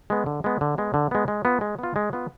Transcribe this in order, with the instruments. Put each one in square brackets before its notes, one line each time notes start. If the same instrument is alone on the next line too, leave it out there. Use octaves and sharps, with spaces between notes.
[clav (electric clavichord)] G#3 B3
D3
G#3 B3
D3
G#3 B3
D3
G#3 B3
G#3
B3 F4
G#3
B3 F4
G#3
B3 F4